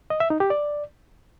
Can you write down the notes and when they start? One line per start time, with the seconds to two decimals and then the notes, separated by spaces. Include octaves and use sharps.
0.10 D#5
0.20 E5
0.30 D#4
0.40 G4
0.50 D5